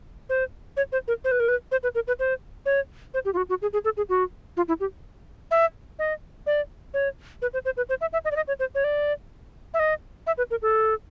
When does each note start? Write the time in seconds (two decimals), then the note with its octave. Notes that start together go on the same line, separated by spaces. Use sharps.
0.29 C5
0.77 C#5
0.92 C5
1.08 A#4
1.24 C5
1.32 B4
1.40 A#4
1.48 B4
1.72 C5
1.83 B4
1.95 A#4
2.07 B4
2.19 C5
2.66 C#5
3.14 C5
3.25 G4
3.34 F4
3.37 F#4
3.49 F#4
3.62 G#4
3.73 G#4
3.85 A4
3.97 G#4
4.09 F#4
4.57 F4
4.68 E4
4.80 G4
5.51 E5
5.99 D#5
6.47 D5
6.94 C#5
7.42 B4
7.54 C5
7.65 C5
7.77 B4
7.89 C5
8.01 E5
8.13 E5
8.25 D#5
8.31 D5
8.36 D#5
8.48 C#5
8.60 C5
8.75 C#5
8.84 D5
9.74 E5
9.79 D#5
10.27 E5
10.38 B4
10.51 A#4
10.62 A4